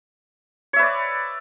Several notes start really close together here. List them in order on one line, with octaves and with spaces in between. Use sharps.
C#5 E5 B4 D5